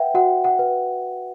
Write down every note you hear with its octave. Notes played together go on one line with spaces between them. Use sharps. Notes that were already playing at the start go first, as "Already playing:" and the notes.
Already playing: B4 E5 F#5 G5
F#4 F#5
F#5
B4